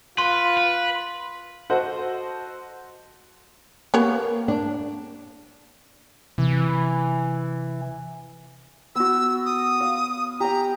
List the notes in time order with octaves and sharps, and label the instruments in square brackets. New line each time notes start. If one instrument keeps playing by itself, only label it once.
[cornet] F4 [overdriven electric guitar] B4 [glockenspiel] C6
[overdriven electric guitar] B4
[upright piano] F#4 A4 C5 D#5 F#5
[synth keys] A#3 [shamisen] B3 G4 C#5
[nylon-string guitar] D4
[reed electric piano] C3 [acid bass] E3
[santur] B3 F#4 [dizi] E6
[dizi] D#6
[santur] F5
[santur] G4 G5 [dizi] A#5